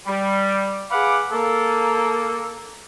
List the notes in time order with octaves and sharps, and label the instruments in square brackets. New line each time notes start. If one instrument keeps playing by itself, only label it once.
[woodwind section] G3
G#4 B4 F5 F#5 B5 D6
A#3 A4